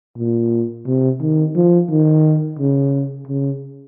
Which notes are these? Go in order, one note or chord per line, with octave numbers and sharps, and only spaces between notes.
A#2
C3
D#3
F3
D#3
C#3
C#3